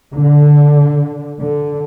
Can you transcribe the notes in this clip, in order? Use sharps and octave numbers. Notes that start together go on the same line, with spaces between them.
D3
D3